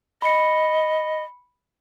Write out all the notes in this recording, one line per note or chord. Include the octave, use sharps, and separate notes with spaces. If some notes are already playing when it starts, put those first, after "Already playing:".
D#5 B5 C#7